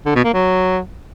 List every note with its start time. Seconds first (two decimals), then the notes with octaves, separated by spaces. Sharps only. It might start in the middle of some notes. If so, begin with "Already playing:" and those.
0.06 D3
0.15 B2
0.25 A#3
0.34 F#3